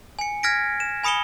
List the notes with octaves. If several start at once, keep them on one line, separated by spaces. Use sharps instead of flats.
G#5 C#7
F6 G#6 A#6 B6 D7
E7
G#5 B5 D#6 C#7 E7 G7